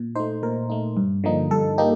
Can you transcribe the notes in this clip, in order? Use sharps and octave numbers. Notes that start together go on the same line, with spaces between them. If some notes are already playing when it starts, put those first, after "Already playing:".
Already playing: A#2
A3 D#4 C5
A#2 A#4
A3 D#4
G2
D3 F3 A#3 D#4
G2 A4
A#3 D#4 G4